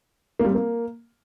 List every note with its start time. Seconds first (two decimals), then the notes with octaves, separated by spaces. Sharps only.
0.39 A#3
0.45 G3
0.50 C4
0.55 A#3